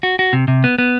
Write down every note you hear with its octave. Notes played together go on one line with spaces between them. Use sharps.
F#4
F#4
C3
C3
B3
B3